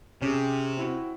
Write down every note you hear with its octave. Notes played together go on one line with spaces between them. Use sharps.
C3 C#4 G4 G#4
C4 E4 F#4